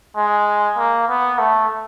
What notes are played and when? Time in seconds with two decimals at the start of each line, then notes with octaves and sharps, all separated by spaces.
0.16 G#3
0.77 A#3
1.08 B3
1.39 A3